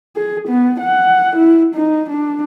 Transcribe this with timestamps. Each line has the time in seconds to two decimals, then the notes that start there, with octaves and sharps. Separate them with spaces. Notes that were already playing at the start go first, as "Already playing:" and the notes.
0.16 G#4
0.48 B3
0.80 F#5
1.36 E4
1.75 D#4
2.10 D4